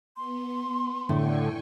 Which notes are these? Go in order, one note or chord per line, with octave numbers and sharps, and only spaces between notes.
B3 C6
A2 D3 G5 G#5 C#6